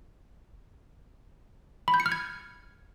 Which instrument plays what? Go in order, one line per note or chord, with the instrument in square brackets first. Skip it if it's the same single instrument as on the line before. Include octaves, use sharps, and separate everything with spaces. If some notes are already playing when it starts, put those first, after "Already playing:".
[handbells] B5
G6
C#7
F6
G#6